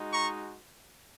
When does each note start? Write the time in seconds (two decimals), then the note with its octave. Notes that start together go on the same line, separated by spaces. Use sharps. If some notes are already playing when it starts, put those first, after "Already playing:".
Already playing: G#3 D#4 F#4
0.13 A#5 C#6